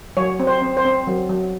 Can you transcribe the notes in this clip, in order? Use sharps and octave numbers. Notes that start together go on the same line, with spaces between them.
F#3 C#5
C4
C5
C4
C5
C4
F#3
F#3